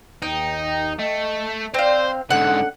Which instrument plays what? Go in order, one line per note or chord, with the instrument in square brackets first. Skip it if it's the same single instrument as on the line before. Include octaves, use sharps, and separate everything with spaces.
[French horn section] D#2 [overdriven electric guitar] D#4 [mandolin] G5
[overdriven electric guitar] A3 [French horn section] D#5
[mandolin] C4 F5 [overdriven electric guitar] C5 [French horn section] D5
[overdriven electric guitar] G#2 D3 [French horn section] C#4 D4 A4 [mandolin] F#5